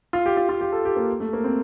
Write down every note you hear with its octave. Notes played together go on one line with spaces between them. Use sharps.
F4
G4
F4
F4
G4
A4
G4
A#3
A3
A#3
C4